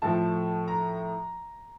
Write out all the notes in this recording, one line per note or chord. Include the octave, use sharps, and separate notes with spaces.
A2 F3 A3 A5
A#5